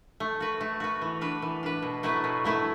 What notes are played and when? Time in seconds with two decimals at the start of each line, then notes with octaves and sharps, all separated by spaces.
0.20 A3
0.40 F#4 B4
0.61 A3
0.80 F#4 B4
1.02 E3
1.21 D4 B4
1.42 E3
1.63 D4 B4
1.82 B2
2.03 F#3 A3 E4 B4
2.24 B2
2.44 F#3 A3 E4 B4